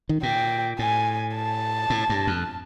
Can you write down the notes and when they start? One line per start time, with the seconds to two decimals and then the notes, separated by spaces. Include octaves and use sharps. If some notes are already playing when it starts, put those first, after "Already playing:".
0.09 D#3
0.23 A#2 G5
0.79 A2 G#5
1.35 A5
1.90 A2
2.10 G2
2.27 F2